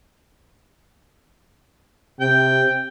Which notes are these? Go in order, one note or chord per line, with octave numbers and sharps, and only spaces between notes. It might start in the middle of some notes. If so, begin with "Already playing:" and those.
C3 G5